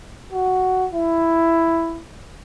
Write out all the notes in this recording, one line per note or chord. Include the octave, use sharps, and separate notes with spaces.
F#4
E4